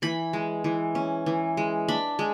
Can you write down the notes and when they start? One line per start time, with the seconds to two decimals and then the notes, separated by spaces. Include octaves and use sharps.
0.02 E3 B5
0.33 G#3
0.64 E3
0.95 C#4
1.26 E3
1.57 G#3
1.88 D4 B5
2.19 G#3